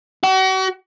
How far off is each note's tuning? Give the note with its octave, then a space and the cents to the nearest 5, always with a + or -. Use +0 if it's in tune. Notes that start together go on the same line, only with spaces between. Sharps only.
F#4 +40